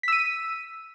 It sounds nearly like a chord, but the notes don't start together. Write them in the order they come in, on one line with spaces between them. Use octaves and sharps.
B6 E6 D#7